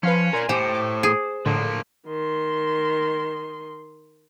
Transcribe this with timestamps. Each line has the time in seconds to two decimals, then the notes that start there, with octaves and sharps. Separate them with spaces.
0.03 F3 C#4 B4 F5 C6
0.33 A#4 D5 G#5 C6
0.49 A2 G4 C5
0.72 D6
1.03 G#4
1.46 A2 D3 F3 A#3
2.07 D#3 C6